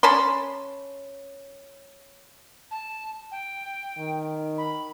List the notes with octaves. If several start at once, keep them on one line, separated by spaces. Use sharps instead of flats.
C#4 A5 B5 C6
A5
G5
D#3
B5